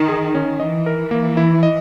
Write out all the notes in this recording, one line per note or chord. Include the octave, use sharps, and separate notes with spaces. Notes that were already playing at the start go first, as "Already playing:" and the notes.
Already playing: D#3
G#4
C#4
E3 D#5
A#4
A#3
E4
D#5